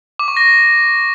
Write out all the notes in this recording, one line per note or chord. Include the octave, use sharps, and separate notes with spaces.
D6
C#6
A#6